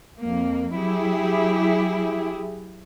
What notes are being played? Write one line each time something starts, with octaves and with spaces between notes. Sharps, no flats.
F2 A#3
F#3 E4 G4 G#4